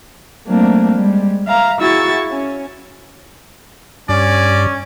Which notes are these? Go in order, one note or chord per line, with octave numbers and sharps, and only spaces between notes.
F#3 A3 A#3 C4 D4
G3 G#3
E5 F5 A#5
E4 F#4 G#4 C#6 E6 A6
C#4
G2 C#4 D5